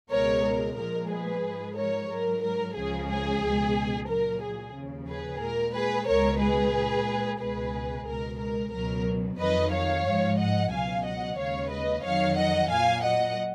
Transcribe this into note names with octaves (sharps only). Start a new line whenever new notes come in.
C#2 B2 G#3 A#4 C#5
A#4
A#2 F3 G#3 A#4
G#4 B4
G#2 F3 G#3
A#4 C#5
G#2 F#3 A#4
A#4
C#2 C#3 F3 G#3 G#4
G#4
C#2 B2 G#3
A#2 F#3 A#4
G#4
D#2 C#3 F3
G#4 B4
A#2 G#3 A#4
G#4 B4
C#2 B2 G#3 A#4 C#5
G#4 B4
A#2 G#3
C#2 B2 G#3 G#4 B4
C#2 B2 G#3 A#4
A#4
C#2 B2 F#3 A#4
F2 D#3 F#3 B4 D#5
C#5 F5
G#2 F3 G#3
D#5 F#5
C#2 B2 F#3 F5 G#5
D#5 F#5
D#2 C#3 G#3 C#5 F5
B4 D#5
F2 D#3 F#3 C#5 F5
D#5 F#5
A#2 F#3 F5 G#5
D#5 F#5